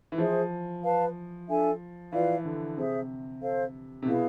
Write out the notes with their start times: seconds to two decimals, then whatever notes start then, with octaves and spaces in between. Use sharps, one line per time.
0.12 E3
0.18 F3 G#4 C5 E5
0.83 B4 F5 A5
1.48 D4 A4 E5 G#5
2.12 E3 F4 B4 D5 F5
2.45 D3
2.77 C3 G#4 C5 E5
3.41 A4 C5 F5
4.02 C3
4.05 B2 E4 G#4 B4 F5